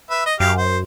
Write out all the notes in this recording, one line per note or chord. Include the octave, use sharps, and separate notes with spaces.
B4 E5
D#5
F#2 G4 F5
C5